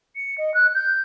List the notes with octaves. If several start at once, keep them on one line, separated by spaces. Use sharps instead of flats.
C#7
D#5
F#6
G6